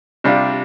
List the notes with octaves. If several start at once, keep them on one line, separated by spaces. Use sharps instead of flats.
C3 G3 D4 F4